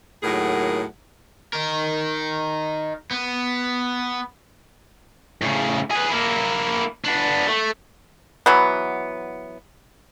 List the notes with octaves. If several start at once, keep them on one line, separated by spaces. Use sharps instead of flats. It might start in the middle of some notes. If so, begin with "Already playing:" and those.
D#2 A2 F#3 G#4 A#4 F#5
D#4 A#4
B3
A2 C#3
G#4 B4
A#3 E4
B3 D4
A3
E3 F#3 B3